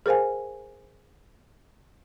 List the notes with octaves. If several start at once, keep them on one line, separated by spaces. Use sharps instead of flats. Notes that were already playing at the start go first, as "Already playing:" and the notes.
G#4 A#4 C5 F5 G#5